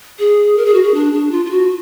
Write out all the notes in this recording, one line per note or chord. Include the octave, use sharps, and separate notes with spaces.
G#4
A#4
G#4
F#4
G#4
D4
D4
F4
F4
F#4